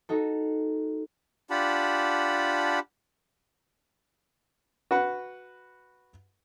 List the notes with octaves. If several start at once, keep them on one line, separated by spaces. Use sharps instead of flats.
D#4 F#4 A4
D4 F4 G4 F#5 A5 B5
F#4 B4 F#5